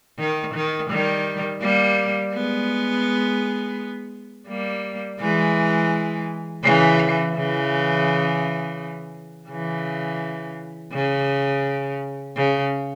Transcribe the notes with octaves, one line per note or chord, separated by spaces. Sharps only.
D#3
D#3
D#3 G3
G3 A#3
G#3 B3
G3 A#3
E3 G#3
C#3 E3
C#3 E3
C#3 E3
C#3
C#3